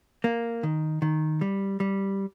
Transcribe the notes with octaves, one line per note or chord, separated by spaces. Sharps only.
A#3
D#3
D#3
G3
G3